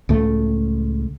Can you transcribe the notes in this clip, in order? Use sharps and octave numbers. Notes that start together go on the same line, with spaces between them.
C#2 A2 A3